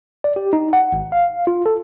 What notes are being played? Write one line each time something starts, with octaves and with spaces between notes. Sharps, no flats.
D5
G4
D#4
F#5
G#1
F5
F4
A4